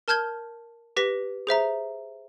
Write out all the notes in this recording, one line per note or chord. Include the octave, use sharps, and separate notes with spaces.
A#4 A5 F6 G6 G#6 G7
G4 B4 A#6 B6
G#4 C5 E5 A#5